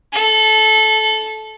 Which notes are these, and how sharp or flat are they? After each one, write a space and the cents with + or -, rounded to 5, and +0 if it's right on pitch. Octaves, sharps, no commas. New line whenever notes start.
A4 -20